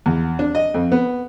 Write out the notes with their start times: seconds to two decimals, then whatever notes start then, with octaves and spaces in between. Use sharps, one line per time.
0.06 E2
0.39 D4
0.55 D#5
0.74 F2
0.92 B3